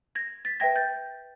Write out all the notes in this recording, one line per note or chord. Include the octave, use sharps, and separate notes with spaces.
G#6 A#6
A6 B6
B4 E5 G5 G#6 A#6
G6 A6